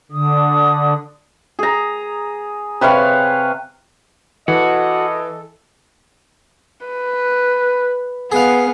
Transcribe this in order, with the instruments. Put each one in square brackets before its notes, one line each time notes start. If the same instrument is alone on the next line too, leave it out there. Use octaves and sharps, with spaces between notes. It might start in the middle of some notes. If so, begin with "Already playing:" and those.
[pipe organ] D3 [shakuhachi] D#6
[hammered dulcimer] G#4 A#5
C3 B4 C#5 F5
[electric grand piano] E3 [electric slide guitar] F#4 [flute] A4 [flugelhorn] D#5
[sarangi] B4
[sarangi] B3 [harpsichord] G#4 F5